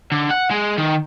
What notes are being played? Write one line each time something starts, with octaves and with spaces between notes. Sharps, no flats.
D3
F#5
G#3
D#3